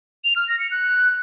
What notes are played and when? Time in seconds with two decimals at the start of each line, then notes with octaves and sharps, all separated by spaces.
0.24 F7
0.36 F6
0.48 A#6
0.59 C#7
0.71 F#6